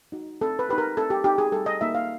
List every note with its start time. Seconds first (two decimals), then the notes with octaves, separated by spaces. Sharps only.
0.12 D#4 F#4
0.41 C4 A4
0.59 B4
0.69 D#4 G4 B4
0.78 A#4
0.97 C4 A4
1.10 G4
1.24 D#4 G4
1.38 G#4
1.52 G3 A4
1.66 D#5
1.81 A#3 D#4 F#4 E5
1.95 F5